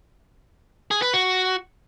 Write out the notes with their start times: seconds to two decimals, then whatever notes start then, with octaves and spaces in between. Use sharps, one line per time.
0.91 G#4
1.02 B4
1.14 F#4